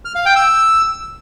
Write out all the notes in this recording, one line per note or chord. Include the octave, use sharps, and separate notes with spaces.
F6
F5
G5
E6